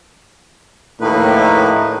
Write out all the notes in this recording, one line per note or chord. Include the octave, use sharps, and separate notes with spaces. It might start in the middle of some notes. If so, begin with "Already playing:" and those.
A#1 D#2 A2 A#3 D#4 B4